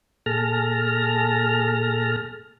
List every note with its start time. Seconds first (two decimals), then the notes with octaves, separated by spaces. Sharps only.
0.26 A#2 G#4 A4 A5 F6 A#6